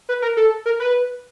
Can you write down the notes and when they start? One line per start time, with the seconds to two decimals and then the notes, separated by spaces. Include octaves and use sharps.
0.09 B4
0.22 A#4
0.37 A4
0.66 A#4
0.80 B4